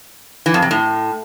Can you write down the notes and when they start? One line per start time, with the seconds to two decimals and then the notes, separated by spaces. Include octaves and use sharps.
0.46 E3
0.54 F2
0.62 C3
0.71 A2